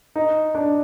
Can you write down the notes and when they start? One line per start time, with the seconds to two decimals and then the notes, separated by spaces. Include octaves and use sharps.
0.16 D#4
0.55 D4